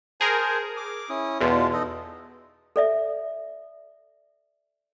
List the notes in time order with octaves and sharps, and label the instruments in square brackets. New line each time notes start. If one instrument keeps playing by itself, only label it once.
[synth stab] G#4 A#4 [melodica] C5 G#5 A5
[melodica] D6
C#4 E4 D#6
[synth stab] E2 B2 [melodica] G#3 F4 A5
[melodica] D#4 A4 D#5
[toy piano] A4 D5 E5